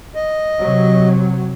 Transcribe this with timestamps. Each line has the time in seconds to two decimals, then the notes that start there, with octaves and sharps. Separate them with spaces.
0.15 D#5
0.59 C3 F#3